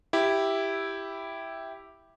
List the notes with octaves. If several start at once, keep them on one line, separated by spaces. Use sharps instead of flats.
E4 G4